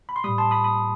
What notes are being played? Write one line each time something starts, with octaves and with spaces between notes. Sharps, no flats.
B5
C6
A2 G3 B5 D#6
A5 C6
B5 D#6
B5 D#6